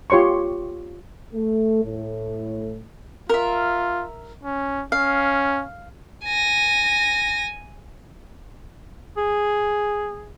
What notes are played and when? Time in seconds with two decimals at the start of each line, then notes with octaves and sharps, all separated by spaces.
0.10 F4 G4 C#5 C6 C#6
1.33 A3
1.84 A2
3.29 F4 A#4 E5
4.43 C#4
4.92 C#4 F5
6.24 G#5 A#6
9.17 G#4